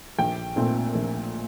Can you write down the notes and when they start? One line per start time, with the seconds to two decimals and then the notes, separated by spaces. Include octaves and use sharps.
0.18 A#1 G5
0.56 A#2 A3 C4
0.95 A#1